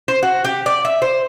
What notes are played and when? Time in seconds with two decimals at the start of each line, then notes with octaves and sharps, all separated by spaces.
0.08 C5
0.23 F#4
0.44 G4
0.66 D5
0.85 E5
1.02 C5